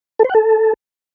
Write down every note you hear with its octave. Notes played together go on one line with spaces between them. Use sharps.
A4
C5
F#5
A4